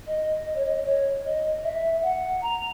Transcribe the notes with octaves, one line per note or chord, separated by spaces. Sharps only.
D#5
D#5
C#5
D#5
C#5
D#5
E5
F#5
A#5